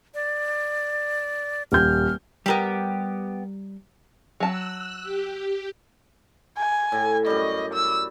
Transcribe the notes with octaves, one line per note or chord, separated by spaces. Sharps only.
D5
D#1 F6 G6
G3 B3 C4 G4 A#4
F#3 A5 E6 F#6
G4
G#5
A2
F#2 G3 D#5
E6